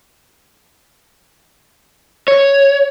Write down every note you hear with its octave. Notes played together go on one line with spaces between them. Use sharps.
C#5